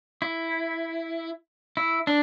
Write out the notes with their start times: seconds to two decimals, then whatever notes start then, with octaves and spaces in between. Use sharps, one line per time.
0.22 E4
1.77 E4
2.07 D4